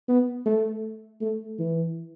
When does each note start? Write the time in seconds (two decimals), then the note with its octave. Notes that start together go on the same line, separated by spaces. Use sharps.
0.08 B3
0.45 A3
1.21 A3
1.59 E3